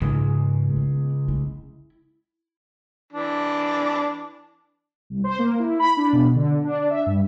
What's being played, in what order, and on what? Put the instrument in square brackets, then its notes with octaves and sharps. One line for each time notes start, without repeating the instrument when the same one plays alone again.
[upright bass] G#2 [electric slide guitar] C#3 G#3
[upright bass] B3
E4
[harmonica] E3 D4
[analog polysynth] C2
C5
A#3
E4
B5
D4
B2
D3
D4
E5
G2